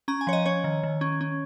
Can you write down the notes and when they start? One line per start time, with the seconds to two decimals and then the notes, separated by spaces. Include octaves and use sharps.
0.08 C#4 A#5
0.21 G#5
0.27 F3 C#5
0.33 D#5
0.46 C#4 C#5
0.64 D#3
0.83 D#3
1.01 C#4
1.21 C#4